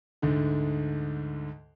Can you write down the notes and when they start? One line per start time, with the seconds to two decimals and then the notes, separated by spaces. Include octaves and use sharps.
0.22 D2 G#2 D3